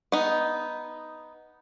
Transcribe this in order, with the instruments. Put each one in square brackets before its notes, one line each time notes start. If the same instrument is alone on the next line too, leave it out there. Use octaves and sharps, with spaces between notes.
[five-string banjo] B3 D#4